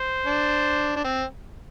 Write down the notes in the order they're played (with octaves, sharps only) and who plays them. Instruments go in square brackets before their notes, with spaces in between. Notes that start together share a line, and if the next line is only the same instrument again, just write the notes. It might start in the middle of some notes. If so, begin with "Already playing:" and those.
Already playing: [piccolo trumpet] C5
[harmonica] D4
D4
C4